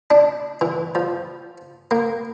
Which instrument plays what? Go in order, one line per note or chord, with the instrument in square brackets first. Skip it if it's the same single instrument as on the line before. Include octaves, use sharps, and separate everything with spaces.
[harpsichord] D4
E3
F3
A#3